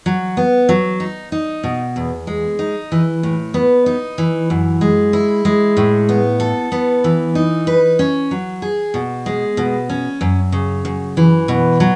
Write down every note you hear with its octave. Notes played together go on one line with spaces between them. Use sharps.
F#3
B3
F#3
D#4
D#4
B2
E2
G#3
D#4
E3
A2
B3
D#4
E3
F#2
G#3
E4
G#3
A2
B3
A4
B3
E3
D#4
B4
C#4
F#3
G#4
B2
G#3
B2
C#4
F#2
C#3
F#2
E3
B2
F#3